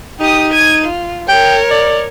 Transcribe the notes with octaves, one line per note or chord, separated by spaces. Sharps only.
D#4 G4 D#6
G#6 D#7
F4
A#4 C#5 G5
D5